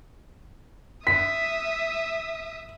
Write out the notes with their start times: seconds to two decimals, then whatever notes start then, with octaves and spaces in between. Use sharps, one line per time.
1.07 E5 D#6 B6